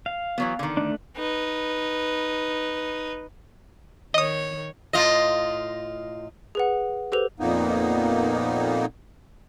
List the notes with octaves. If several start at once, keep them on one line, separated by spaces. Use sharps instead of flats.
F5
E3 F#3 B3
D3 D#3
A3 D4
D#4 B4
D#3 C#5 D#5 D#6
A2 F4 D#5
G#4 B4 F#5
G4 A4 B4 C5 F7
F2 A#2 A#3 B3 D#4